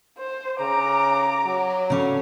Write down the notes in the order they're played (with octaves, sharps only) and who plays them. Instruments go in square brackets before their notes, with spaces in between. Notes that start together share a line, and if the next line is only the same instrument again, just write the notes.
[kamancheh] C5
[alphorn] C#3 [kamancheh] A#5 D6
[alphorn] F#3
[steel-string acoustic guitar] C#3 C#4 [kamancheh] A4 C#5